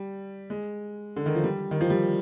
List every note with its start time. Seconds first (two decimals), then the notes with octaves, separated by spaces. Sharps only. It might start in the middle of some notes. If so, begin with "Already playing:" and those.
Already playing: G3
0.50 G#3
1.16 D3
1.26 D#3
1.35 F3
1.44 G3
1.71 D#3
1.81 F3
1.90 G3